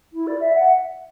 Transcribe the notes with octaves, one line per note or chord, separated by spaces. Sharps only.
E4
D5
E5
F#5